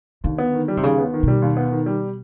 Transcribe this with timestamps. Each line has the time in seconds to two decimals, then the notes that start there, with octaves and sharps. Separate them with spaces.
0.24 D#2 D3
0.38 B3
0.53 D#3
0.68 G3
0.77 C3
0.83 D#2 C#3
0.98 B3
1.13 D#3
1.23 B2 G3
1.42 D#2
1.57 B3
1.72 D#3
1.86 G3